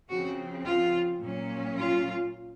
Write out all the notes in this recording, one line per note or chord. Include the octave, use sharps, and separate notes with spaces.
C#3 F3 C4 F#4
F4
A#2 F#3 C#4
F4